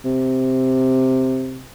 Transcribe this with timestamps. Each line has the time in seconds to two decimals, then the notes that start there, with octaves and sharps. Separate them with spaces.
0.05 C3